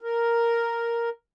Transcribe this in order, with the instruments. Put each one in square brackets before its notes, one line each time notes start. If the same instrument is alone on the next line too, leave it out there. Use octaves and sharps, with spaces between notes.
[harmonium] A#4